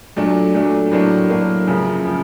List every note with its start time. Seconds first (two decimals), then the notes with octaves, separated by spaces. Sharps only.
0.16 A#2 F#3 A3 D4
0.54 A#2 F#3 A3 D4
0.92 A2 F#3 A#3 D4
1.30 A2 F#3 A#3 D4
1.67 F#2 C#3 F3
2.05 C#3 F3